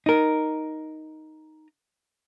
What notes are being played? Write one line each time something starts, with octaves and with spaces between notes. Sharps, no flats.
D#4 A#4